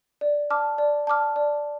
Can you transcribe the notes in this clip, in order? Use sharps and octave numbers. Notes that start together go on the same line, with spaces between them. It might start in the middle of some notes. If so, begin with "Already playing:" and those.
D5
A5 D6 F6
D5
A5 D6 F6
D5